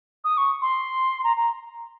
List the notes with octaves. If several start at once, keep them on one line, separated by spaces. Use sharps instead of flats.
D#6
C#6
C6
A#5
A#5